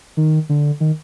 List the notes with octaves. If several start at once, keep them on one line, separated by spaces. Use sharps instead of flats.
D#3
D3
D#3